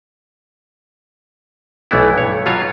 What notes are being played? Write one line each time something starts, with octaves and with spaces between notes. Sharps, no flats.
B1 E3 A3 B3 E4
G2 C#5
B2 F#3 F4 C#5 F5